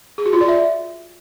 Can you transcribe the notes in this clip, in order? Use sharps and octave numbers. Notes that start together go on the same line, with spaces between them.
G#4
F#4
F4
D5
E5